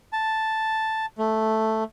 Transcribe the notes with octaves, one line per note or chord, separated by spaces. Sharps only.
A5
A3